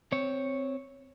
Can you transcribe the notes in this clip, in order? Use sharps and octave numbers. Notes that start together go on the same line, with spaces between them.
C4 C#5